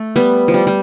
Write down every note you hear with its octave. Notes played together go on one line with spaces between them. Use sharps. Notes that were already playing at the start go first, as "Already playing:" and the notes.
Already playing: A3
G3 B3
F3
G3
G3